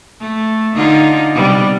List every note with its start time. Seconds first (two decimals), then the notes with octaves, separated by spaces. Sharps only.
0.20 A3
0.75 D3 D#4 F4
1.35 C3 G3 B3